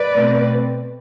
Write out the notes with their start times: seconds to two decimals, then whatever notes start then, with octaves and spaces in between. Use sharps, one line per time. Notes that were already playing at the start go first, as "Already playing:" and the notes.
Already playing: B4 D5
0.13 B2 A3 C4